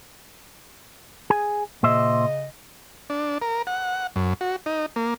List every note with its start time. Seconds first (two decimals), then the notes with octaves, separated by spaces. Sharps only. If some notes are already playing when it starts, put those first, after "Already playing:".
1.30 G#4 G#5
1.83 A#2 C#3 C5 D#5 E5
3.10 D4
3.42 A#4
3.67 F#5
4.16 F#2
4.41 F#4
4.66 D#4
4.96 A#3